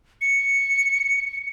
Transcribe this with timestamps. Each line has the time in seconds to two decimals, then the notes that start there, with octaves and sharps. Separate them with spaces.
0.21 C#7